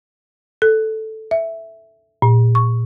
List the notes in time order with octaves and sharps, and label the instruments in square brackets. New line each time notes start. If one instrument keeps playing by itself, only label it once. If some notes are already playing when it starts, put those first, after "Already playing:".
[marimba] A4
E5
A#2
C#6